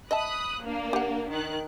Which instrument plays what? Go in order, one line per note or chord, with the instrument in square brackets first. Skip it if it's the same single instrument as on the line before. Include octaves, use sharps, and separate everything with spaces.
[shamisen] D#5 E5 A5 [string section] B5 D#6 F#6
[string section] A#3 D4
[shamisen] G4 F#5
[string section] D#3 F#6